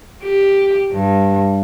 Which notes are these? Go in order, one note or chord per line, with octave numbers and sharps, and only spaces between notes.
G4
G2